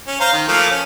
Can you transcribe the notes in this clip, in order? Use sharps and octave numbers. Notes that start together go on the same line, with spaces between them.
C#4
C5 F5 A#5
D#3
F3 A3 A#3
C#4